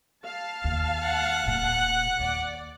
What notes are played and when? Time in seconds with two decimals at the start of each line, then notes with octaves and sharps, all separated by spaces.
0.25 F5 A5
0.64 D#2
1.06 F#5
1.43 D#1 A#2
2.20 D#2 D5